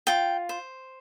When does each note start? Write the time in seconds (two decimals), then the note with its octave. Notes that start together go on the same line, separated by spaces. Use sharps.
0.07 F4 G5
0.49 C5